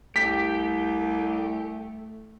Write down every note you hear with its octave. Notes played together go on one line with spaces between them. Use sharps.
C2 A3 G4 B6